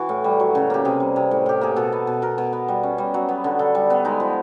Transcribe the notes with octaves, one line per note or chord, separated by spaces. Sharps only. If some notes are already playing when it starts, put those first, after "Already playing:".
Already playing: E3 F#4
A2
G3
F#3
C#3
A#3 G4
C3 G#4
G3
C3
A2
A2 G4
A#3 G#4
B2 A4
B3
B2
B2 A#4
B2
B3
G3
C#4
G3
F#3
B3
D3
D3 A4
G3
B3
G#3 D#4
F3